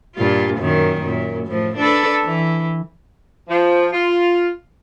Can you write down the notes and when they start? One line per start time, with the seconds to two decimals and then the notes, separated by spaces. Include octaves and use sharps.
0.16 G2 A#2 F4
0.58 F#2 A#2 D#3
1.02 F#2 A#2
1.47 A2 F3
1.77 D4 A4 B4
2.23 E3
3.48 F3
3.92 F4